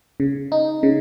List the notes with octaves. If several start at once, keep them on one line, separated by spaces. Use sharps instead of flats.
C#3
D#4
C#3